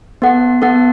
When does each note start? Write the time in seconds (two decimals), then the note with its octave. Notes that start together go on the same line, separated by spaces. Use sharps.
0.22 B3 A4 F#5
0.62 B3 A4 F#5